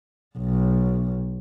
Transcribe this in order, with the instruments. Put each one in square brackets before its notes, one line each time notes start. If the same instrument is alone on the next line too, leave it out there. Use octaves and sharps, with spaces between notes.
[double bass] B1